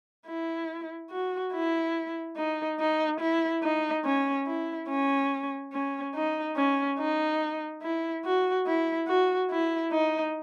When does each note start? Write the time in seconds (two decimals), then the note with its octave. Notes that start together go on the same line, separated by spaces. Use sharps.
0.27 E4
1.11 F#4
1.53 E4
2.37 D#4
2.79 D#4
3.20 E4
3.63 D#4
4.05 C#4
4.46 E4
4.89 C#4
5.73 C#4
6.14 D#4
6.56 C#4
6.98 D#4
7.82 E4
8.25 F#4
8.66 E4
9.08 F#4
9.50 E4
9.92 D#4